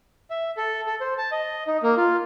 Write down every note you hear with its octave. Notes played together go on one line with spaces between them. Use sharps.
E5
A4
A4
C5
A5
D#5
D#4
A#3
F4